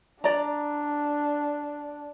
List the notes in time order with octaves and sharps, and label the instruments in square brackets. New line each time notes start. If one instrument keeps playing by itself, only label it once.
[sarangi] D4 [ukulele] D5 A#5